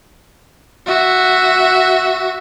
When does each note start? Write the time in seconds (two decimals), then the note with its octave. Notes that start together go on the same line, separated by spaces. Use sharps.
0.87 F#4 E5